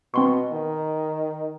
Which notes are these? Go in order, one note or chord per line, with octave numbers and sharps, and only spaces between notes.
B2 C4 C6 C#6
D#3